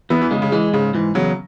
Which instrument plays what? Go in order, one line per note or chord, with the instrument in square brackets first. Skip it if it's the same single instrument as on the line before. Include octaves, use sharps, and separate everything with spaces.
[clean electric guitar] E2 [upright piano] B3 E4
[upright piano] E3
[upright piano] C#3 [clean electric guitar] G#3
[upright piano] C#3
[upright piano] E3 [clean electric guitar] G#3
[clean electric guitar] G#2 [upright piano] C#3
[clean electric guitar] G#2 [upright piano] E3
[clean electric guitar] E2 [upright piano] C#3 F#3